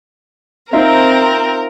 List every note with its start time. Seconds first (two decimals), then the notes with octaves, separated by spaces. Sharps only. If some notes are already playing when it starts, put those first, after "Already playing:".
0.73 C4 D#4 F4 A#4 E5